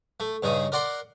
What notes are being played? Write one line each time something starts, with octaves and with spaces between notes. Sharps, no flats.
A3
G2 C#3 D#4 D#6
A#4 D5 F#5 C6